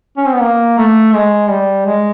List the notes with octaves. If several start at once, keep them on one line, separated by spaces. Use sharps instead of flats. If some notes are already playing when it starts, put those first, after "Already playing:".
C#4
C4
B3
A#3
A3
G#3
G3
G#3